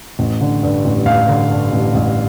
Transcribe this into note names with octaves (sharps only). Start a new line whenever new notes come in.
A1
D3
G2
A1
A1 F5
D3
G2
A1
A1